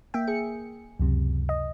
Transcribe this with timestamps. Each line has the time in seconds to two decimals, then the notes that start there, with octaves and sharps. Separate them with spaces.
0.14 A#3 E5 G5
0.27 G#4 C#7
0.99 C#2 F#2 C3
1.49 D#5